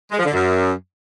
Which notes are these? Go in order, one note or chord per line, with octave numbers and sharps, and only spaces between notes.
G#3
F3
D3
F#2